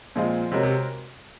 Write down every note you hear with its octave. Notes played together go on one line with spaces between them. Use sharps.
A#2 F3 G#3 C4 F4
C3 G#3 C4 F#4 A#4 C#5
C3